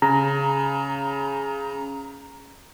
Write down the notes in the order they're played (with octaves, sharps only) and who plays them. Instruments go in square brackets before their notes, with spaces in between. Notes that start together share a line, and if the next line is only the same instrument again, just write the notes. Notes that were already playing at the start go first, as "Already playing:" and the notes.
[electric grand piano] C#3 [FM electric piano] A#5